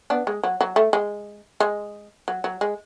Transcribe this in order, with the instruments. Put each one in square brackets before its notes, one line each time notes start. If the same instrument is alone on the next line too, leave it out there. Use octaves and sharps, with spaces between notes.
[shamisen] B3 D4
G#3
F#3
F#3
A3
G#3
G#3
F#3
F#3
G#3